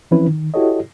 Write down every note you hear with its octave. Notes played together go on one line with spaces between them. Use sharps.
E3 F3 C4 C#4 E4 B4
D#3
E4 F#4 G4 A4 C#5 D#5